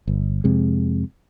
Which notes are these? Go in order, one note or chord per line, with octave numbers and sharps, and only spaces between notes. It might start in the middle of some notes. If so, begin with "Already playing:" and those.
G1
F2 C3 G#3